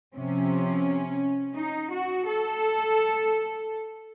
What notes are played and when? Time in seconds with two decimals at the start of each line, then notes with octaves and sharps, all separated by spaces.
0.15 C3 F3 C#4
1.56 D#4
1.91 F#4
2.26 A4